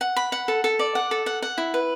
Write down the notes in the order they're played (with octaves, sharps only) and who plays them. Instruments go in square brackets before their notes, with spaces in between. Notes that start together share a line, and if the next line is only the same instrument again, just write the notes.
[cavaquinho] F#5
B5
F#5
A4
A4
D5
F#5
A4
F#5
F#5
E4
B4